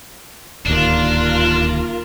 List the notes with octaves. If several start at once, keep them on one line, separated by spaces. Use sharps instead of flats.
D1 D#2 D4 F4 A#4